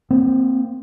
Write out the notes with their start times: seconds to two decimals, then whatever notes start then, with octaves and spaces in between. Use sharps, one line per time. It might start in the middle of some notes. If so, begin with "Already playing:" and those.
0.10 A#3 C4